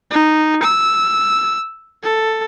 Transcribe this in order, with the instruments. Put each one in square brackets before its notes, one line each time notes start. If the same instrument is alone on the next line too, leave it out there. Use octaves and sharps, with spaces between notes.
[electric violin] D#4
E6
A4